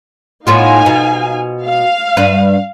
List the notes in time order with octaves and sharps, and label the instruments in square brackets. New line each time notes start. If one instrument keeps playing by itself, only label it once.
[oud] A2 B3 F4 [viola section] D#4 F5 G#5
[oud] B2
[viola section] F5
[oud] G2 B4